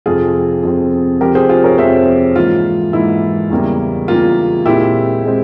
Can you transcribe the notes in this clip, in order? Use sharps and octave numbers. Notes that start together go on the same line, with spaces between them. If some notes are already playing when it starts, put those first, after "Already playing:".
F2 C3 F3 C4 F4 G#4
F2 C3 F3 C4
F2 C3 F3 C4 G4 A#4
G#4 C5
F4 G#4
A#4 C#5
F2 C3 F3 C4 C5 E5
G#2 E3 A#3 F4
G#2 E3 A#3 E4
E2 C#3 G3 A#3
E2 C#3 G3 A#3 F4
A#2 G#3 C4 E4 G4
A#2 G#3 C4